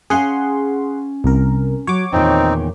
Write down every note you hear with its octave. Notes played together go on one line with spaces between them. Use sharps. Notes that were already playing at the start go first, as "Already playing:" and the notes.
C#4 G#4 F5 F#5 G#5 C6
C2 A#4
F#3 C#5 D6
E2 A#2 D#3 C4 D#4